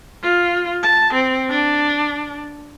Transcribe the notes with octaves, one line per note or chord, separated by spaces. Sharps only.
F4
A5
C4
D4